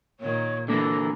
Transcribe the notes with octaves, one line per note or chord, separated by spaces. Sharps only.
A#2 D#3 C#5
D3 E3 A#3 A4 A#4